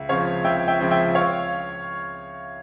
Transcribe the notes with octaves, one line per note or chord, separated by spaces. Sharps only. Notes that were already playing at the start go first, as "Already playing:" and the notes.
Already playing: C#2 E5
C#3 F3 C4 C#5 F5
C#2 E5 G5
E5 G5
C#3 F3 C4
E5 G5
C#5 F5